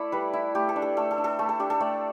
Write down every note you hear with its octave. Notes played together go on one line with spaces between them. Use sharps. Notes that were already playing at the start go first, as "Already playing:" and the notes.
Already playing: A3 E4 A4 D5
G3 B4
E4
A3 G4
A4
D4
A4
A3 A4
A4
D4
A4
A3 A5
A4
D4 G4
A4
A3 D5